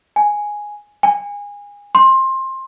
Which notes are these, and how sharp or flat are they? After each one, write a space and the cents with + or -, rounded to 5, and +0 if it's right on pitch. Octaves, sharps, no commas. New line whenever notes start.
G#5 +0
G#5 -25
C6 +20